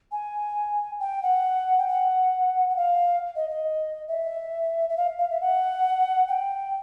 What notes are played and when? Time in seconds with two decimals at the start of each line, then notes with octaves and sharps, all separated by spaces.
0.12 G#5
1.00 G5
1.23 F#5
1.79 G5
1.88 F#5
2.69 F#5
2.77 F5
3.36 D#5
3.50 D#5
4.08 E5
4.90 E5
4.97 F5
5.19 F5
5.30 E5
5.41 F#5
6.28 G5